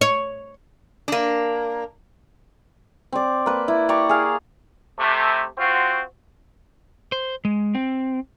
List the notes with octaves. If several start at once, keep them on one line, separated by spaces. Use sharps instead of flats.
C#5
A#3 D4
C4 D5
A#3 B4
E4
G4 D5 A#5 C#6
G#4 F5
C3 A3
C4 F4 F#4
C5
G#3
C4